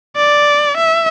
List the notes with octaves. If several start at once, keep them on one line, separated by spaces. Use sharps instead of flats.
D5
E5